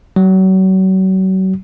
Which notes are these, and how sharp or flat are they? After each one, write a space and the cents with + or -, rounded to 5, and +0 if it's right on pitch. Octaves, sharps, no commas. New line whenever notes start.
F#3 +35